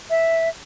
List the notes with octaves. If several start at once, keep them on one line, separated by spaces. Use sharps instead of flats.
E5